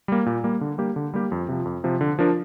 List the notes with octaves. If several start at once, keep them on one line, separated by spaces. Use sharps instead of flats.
G3 A#3
A#2
G3 A#3
D3
G3 A#3 G4
D3
G3 A#3 G4
F2
C3 F3
F2
C3 F3
D3
F3 D4 A#4